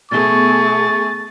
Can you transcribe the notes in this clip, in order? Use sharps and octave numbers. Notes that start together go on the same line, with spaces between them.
B2 A3 B3 G#4 C#6 A6